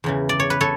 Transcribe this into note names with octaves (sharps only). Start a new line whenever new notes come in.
E2 C#3 E3
D5
C#5
B4
A4 C#5